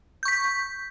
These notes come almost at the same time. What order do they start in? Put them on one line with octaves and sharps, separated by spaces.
G6 C#6 B6